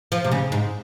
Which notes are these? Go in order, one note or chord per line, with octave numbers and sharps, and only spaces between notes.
F3
C3
C#3
G#2